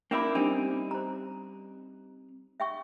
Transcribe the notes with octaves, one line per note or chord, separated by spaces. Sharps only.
A#3 C#4 D4 E4 A#4 B5
G3 C4 D4 D#4
C5 A#5
E5 G5 C#6